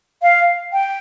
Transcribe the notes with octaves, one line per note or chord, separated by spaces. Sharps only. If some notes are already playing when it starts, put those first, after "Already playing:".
F5
G5